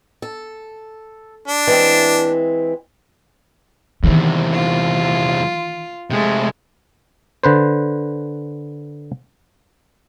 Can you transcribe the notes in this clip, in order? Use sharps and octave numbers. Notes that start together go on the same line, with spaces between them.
A4
D4
E3 G#3 C4
E2 C3 D#3 E3
F4
C3 G#3 A3
D3 B4 C5